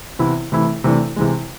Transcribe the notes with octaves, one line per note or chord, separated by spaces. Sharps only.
C3 E3 B3 E4
C3 E3 A3 E4
C3 E3 A3 D4
C3 E3 G#3